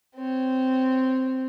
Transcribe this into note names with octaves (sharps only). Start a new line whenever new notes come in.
C4 C#5